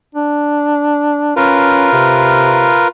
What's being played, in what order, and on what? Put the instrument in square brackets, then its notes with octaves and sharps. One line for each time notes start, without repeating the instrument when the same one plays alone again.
[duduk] D4
[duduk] C#4 [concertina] F4 A#4 B4
[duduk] C3